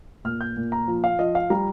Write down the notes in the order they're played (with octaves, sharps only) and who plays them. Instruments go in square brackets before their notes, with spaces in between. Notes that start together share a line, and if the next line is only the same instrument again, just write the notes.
[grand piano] A#2 F6
G6
A#2
A#5
F3
F5
F3 D#5
F5
G3 A#5